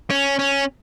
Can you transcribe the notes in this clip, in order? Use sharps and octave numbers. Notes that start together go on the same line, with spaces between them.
C#4
C#4